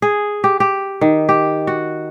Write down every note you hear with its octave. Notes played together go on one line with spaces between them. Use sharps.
G#4
G4
G4
D#3
G4
F#4